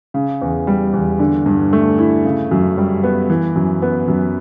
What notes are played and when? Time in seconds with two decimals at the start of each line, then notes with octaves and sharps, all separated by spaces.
0.14 C#3
0.42 E2
0.67 G3
0.94 E2
1.20 D3
1.46 G2
1.73 A3
1.98 E4
2.25 C#3
2.51 F#2
2.78 G3
3.04 B3
3.30 E3
3.56 F#2
3.82 B3
4.08 F#2